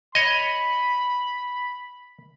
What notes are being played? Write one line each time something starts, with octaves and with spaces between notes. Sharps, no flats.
C#5 D#5 B5